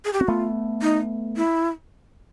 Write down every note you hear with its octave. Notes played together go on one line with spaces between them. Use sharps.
G#4
G4
C4 F#4
A3 B3 F4
D#4
E4